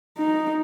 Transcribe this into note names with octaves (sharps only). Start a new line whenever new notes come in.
D#4